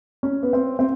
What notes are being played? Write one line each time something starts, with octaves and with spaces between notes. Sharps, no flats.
C#4
B3
C4
C4